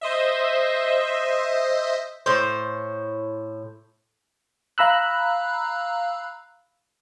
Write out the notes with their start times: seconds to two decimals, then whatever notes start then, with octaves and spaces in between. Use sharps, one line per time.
0.01 C5 D#5 E5
2.26 A2 C5
4.78 F5 A#5 B5 E6 F#6